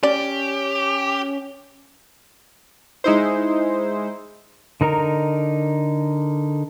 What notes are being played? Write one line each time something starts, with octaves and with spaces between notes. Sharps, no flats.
C#4 G4 D5
G#3 D#4 E4 C5
D3 D#4 A#4 A#5